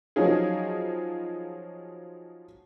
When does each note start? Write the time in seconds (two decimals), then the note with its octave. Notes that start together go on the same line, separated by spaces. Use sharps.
0.16 F3 F#3 C#4 D#4 F4 G#4